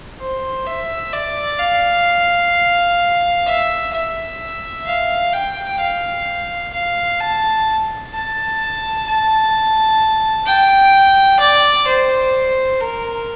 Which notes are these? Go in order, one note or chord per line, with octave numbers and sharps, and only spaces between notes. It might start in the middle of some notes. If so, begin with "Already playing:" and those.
C5
E5
D5
F5
E5
E5
F5
G5
F5
F5
A5
A5
A5
G5
D5
C5
A#4